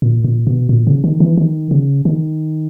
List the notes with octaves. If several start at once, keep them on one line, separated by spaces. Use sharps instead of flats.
A#2
A#2
B2
A#2
C#3
D#3
E3
D#3
C#3
D#3